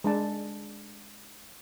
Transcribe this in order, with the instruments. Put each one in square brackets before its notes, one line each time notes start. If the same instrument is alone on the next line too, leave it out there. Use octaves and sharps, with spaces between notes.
[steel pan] G#3 D4 A5